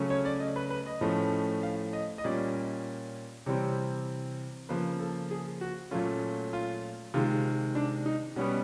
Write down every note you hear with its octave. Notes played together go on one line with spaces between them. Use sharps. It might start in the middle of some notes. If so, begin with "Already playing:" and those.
Already playing: C#3 F#3 A3 C#4
C#5
D5
D#5
B4
B4
D#5
A2 F3 A3 C#4
F5
D#5
D#5
A#2 G3 A#3 C#4 D5
C3 E3 G3 C4 C#5
C#3 F3 A#3 B4
A4
G#4
F#4
A#2 F#3 A3 C#4 F4
F4
C3 D#3 G#3 F4
D4
D#4
B2 G3 B3 C#4